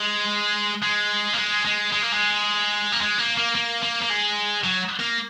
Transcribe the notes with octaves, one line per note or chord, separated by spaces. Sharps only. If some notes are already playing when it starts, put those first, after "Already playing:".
Already playing: G#3
G#3
A#3
G#3
G#3
G#3
A#3
G#3
A#3
G#3
A#3
A#3
A#3
A#3
A#3
G#3
F#3
A#3